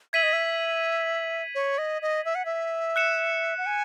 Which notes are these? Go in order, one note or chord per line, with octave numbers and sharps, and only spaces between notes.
E5 G#6 B6 D#7 F#7
D#5
E5
C#5
D#5
D#5
E5
F#5
E5
F#6 C#7 E7
F#5
G#5